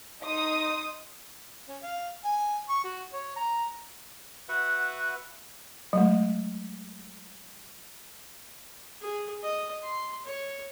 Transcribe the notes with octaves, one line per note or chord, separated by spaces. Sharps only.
D#4 C6 D#6
C#4
F5
G#5
C#6
F#4
C#5
A#5
F#4 B4 E5 F#5
F#3 G#3 A3
G#4
D#5
C6
C#5